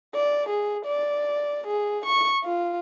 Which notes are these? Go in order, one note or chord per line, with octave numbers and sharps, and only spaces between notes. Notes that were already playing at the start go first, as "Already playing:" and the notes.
D5
G#4
D5
G#4
C#6
F4